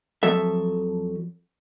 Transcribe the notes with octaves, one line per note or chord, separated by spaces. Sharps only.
F2 F3 F#3 A4 E5